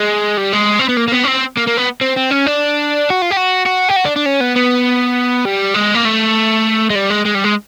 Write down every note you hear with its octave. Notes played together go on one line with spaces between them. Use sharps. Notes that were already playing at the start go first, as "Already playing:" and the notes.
Already playing: G#3
G3
G#3
C4
B3
A#3
A#3
B3
C#4
C4
A#3
A#3
B3
C4
C4
C#4
D4
F#4
F4
G4
F#4
F#4
G4
F#4
D4
D4
C#4
B3
B3
G3
G#3
A#3
A3
G#3
G3
G#3
G#3
G3
G#3